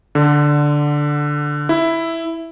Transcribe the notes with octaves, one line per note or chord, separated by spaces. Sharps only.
D3
E4